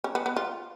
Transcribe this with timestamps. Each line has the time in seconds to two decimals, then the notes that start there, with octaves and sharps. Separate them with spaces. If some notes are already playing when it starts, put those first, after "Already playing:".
0.04 C#4
0.15 B3
0.26 B3
0.36 F4